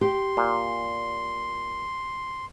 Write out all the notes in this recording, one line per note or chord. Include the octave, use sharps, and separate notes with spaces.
G4 C6
A#2